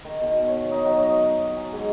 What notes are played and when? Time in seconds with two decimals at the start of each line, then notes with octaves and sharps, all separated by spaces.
0.05 D#3
0.22 B2
0.48 C#5
0.71 D#4
0.85 F#3
1.04 D#5
1.34 D#5
1.57 G#5
1.73 G#2